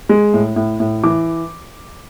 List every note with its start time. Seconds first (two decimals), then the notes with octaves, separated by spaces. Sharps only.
0.09 G#3
0.34 A2
0.56 A2
0.80 A2
1.03 E3 D6